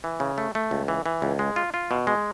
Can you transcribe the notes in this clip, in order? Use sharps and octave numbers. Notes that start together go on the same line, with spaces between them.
E3
C#3
A3
A3
C#2
E3
E3
C#2
G#3
F4
F4
B2
G#3